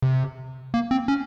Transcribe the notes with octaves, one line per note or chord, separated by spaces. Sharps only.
C3
A#3
C4
C#4